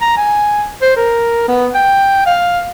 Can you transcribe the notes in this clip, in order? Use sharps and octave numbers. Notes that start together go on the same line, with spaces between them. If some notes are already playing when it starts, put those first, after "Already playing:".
A#5
G#5
C5
A#4
B3
G5
F5